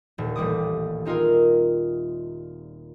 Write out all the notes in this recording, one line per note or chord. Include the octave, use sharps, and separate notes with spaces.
D#1
D#1 A1 G3 D6 D#6
C4 D#4 F4 G#4 A#4